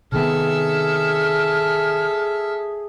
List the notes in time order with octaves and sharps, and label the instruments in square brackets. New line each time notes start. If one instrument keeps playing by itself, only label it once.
[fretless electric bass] C3 D#3 B3 [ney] G#4 [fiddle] A4 E5 [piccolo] F6